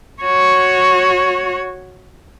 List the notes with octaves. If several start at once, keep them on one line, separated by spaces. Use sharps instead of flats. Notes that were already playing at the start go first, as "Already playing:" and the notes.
F#4 C#5